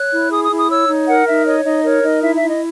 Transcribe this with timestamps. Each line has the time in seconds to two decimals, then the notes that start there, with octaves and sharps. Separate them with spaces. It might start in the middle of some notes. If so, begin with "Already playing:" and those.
Already playing: C#5 F#6
0.12 E4
0.31 G#4 D#6
0.43 D#6
0.51 E4
0.57 D#6
0.70 C#5 E6
0.88 D#4
1.07 A#4 F#5
1.26 D#4 E5
1.45 C#5 D#5
1.64 D#4 D#5
1.84 A#4 C#5
2.03 D#4 D#5
2.22 E4 E5
2.35 E5
2.42 E4
2.48 D#5